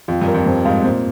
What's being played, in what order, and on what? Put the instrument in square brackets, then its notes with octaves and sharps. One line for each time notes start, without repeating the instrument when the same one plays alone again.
[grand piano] F2 [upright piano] F4
[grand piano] G2
[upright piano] A#4
[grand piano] F2
[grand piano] G2 [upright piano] C4
[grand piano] G#2 [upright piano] F5
[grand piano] A#2 [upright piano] C4